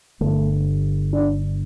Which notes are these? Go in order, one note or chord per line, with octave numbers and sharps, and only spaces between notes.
G1 G2 D3 A3
D4